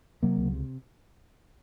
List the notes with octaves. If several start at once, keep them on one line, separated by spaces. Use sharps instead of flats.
C3 F#3 A#3
C#2
C3